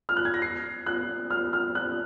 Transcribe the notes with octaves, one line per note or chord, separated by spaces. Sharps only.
F6
F#6
G#6
A#6
C7
F#6
F6
F6
F#6